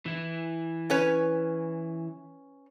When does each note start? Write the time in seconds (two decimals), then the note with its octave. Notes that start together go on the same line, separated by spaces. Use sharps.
0.06 E3 E4
0.90 C#4 B4 C#5